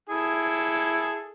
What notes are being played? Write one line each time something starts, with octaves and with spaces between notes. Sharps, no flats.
E4 G#4 A4